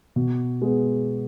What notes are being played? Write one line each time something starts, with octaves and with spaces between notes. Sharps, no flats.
B2
G#3 B3